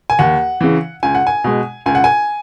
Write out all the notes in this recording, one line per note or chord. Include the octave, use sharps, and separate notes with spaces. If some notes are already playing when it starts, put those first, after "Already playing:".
G#5
D#2 F#5
C#3 E3
C#2 G#5
F#5
G#5
B2 G#3
C#2 G#5
F#5
G#5